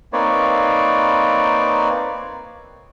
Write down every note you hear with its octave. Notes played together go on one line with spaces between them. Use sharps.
A#3 C4 D#4 B4 C#5 D5